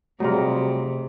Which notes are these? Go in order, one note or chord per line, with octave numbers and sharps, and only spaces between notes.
C3 F#3 G3 A3 F4 G#4